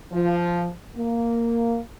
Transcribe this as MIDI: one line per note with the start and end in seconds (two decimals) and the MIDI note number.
0.12 0.69 53
0.96 1.78 58